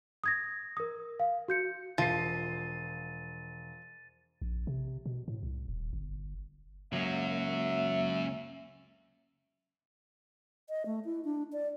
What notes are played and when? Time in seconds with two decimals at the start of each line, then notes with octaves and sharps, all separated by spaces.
0.24 D#6 G#6 A#6
0.77 A#4 D#6
1.20 F5
1.48 F#4 G6 C#7
1.98 E1 F3 A6 C7 D#7
4.42 A#1
4.67 C3
5.06 B2
5.28 A2
5.43 C2
5.68 D#1
5.93 G1
6.93 C#2 F#3 A#3 C#4 F#4 E5
10.69 D#5
10.86 A3
11.05 E4
11.25 D4
11.53 D5